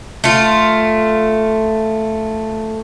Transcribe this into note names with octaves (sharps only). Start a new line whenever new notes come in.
A3 F4